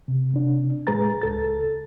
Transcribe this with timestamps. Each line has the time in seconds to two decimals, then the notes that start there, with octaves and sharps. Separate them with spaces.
0.08 C3
0.34 C3 D4
0.87 A2 G#3 G#4 B4 A#5 A6
1.22 C#2 A4 A6